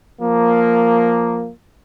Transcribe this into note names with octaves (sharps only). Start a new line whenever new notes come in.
F3 A#3